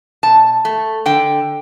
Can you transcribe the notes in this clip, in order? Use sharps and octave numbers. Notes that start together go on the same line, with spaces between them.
B2 A5
A3
D3 G5